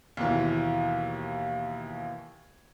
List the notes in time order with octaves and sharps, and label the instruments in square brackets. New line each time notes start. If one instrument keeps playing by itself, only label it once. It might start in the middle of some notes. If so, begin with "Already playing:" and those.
[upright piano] D#2 B2 E3